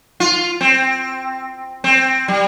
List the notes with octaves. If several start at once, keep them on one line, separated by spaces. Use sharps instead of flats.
F4
C4
C4
G3